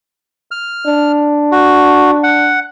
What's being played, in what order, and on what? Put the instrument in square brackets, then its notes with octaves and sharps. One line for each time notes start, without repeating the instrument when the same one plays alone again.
[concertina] F6
[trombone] D4
[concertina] F#4
F#5